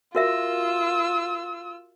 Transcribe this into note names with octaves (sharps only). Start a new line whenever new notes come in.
F4 F#4 A#4 E5 E6